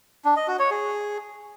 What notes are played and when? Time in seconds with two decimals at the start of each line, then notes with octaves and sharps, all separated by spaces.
0.25 D4
0.36 D#5
0.48 F#4
0.59 C#5
0.71 G#4